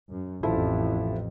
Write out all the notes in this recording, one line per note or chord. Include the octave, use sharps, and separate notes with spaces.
F#2
A1 F2 F3 E4 A4